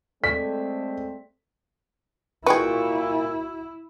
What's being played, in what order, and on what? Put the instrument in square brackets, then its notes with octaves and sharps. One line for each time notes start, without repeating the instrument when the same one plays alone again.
[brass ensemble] G#3 A3 C4 [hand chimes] A4 D5 [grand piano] B6
[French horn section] A#2 [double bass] E4 [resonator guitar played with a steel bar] F#4 G5 [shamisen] G#4 B4